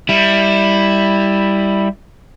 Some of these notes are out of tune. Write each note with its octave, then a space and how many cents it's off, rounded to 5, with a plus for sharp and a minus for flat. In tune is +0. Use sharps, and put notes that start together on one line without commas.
G3 +10 E4 +0